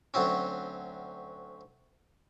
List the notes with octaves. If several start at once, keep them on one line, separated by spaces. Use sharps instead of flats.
D2 F#3 C4 C#4